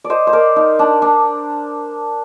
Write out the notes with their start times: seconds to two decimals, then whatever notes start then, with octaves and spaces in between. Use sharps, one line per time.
0.04 D5
0.10 C5 D#5
0.27 C5
0.33 A#4 D5
0.56 D#4
0.79 D4
1.02 D4